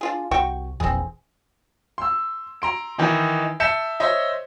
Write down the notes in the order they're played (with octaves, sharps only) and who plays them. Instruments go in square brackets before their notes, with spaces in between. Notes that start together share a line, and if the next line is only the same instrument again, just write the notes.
[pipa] D4 F4 G#4
[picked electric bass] C2 [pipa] F#4 G5 C#6
[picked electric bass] F1 A#1 E2 [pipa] C4 G#4
[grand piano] C6 E6
A#5 C6 D7
D#3 E3 D#4
E5 A5 G6 C#7 E7
C5 C#5 D#5 E5